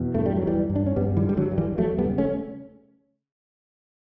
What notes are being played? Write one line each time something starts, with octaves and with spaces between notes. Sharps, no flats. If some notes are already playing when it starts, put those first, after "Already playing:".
Already playing: E2 B2
G2 A3
G3
F#3
D3
E3 G3
G2
D4
C#4
G2 G3 B3
E3 G3
D3
G3
D3 F#3
G2
E3 G3
E2 F#3 A3
G3 B3
C#3
A3 C#4